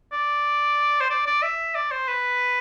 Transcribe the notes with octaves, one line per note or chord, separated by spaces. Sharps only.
D5
C5
D5
D5
E5
D5
C5
B4